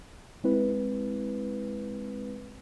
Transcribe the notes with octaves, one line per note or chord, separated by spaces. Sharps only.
G#3 C4 E4 B4